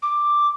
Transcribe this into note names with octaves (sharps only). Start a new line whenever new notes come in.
D6